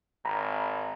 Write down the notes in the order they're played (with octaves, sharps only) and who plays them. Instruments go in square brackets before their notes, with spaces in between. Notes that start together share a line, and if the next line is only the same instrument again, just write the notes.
[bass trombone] G#1 [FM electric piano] A#5 B5